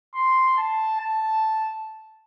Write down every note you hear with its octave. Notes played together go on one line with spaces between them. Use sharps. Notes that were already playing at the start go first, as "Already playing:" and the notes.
C6
A5
A5